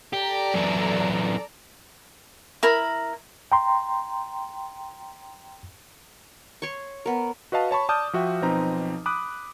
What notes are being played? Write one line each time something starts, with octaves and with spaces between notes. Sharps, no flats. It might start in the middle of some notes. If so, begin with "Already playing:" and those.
G4 A4 D5 A#5
F#2 E3
E4 A#4 B5
G5 A#5 C6
C#5 C6 C#6
B3 A#4
F#4 B4 D#5 F5 A5
C#5 A5 B5 C#6
D5 A5 D6 D#6 F6 G6
F3 F#4 E5 G5
B1 F3 C4 D#4 B4 A#5
B5 D6 D#6 F#6